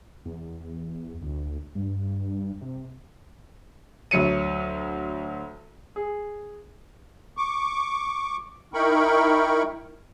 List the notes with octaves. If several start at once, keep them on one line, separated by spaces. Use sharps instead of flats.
E2
D2
G2
C3
D2 F#3 C#7 D#7
G#4
C#6 D6
D#4 E4 A#4 G5 B5 C#6